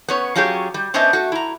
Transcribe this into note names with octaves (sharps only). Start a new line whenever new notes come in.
B3 C#4 C#5
F#3 C#4 F4 G4 G#4 C#5
G3
B3 C#4 D4 C5 D#5 E5
A3 F#4
E4 A#5